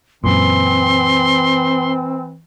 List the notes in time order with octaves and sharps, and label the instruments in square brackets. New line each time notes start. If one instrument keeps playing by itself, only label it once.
[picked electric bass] F#2 A#2 [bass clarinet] E3 [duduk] C4 [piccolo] C6